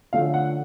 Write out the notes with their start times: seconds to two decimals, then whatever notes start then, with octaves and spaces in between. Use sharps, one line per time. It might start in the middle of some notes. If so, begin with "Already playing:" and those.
0.13 D3 F3 A3 C#4 F5
0.34 F#5